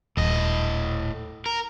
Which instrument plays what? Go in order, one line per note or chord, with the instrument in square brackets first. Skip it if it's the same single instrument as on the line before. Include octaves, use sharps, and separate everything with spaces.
[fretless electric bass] D#1 [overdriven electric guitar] A2 D#5
[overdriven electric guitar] A#4